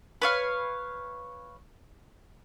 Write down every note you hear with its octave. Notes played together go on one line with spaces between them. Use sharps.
B4 C#5 F5